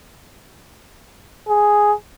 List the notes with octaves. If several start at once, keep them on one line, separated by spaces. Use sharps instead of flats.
G#4